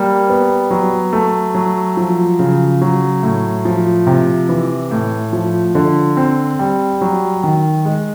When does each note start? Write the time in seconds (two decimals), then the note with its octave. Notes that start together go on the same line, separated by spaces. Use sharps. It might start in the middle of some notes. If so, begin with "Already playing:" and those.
Already playing: G3 A#3
0.29 B3
0.71 F#3
1.13 A3
1.54 F#3
1.97 F3
2.39 C#3
2.81 F#3
3.23 A2
3.65 F3
4.07 C3
4.49 E3
4.91 A2
5.33 F3
5.75 D3
6.17 C4
6.59 G3
7.01 F#3
7.44 D#3
7.85 G#3